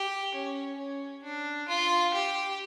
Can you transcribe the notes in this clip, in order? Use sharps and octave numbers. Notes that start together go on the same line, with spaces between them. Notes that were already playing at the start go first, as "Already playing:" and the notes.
Already playing: G4
C#4
C#4
D4
F4
G4